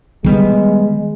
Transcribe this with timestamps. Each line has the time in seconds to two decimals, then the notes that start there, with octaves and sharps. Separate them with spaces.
0.24 D#3 G3 G#3 B3